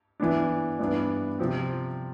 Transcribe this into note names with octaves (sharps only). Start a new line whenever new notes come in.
E3 B3 D4
G2 E3 B3 D4
C3 F3 C4